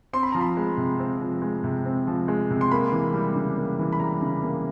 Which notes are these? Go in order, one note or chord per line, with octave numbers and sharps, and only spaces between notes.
C4 C6
B5
F3 A#5
B5
G#3
C3
C4
F3
G#3
C3
C4
F3
G#3
C3
C6
A#3 B5
E3
G3
C#3
A#3
E3
B5
G3 A#5
C#3
A#3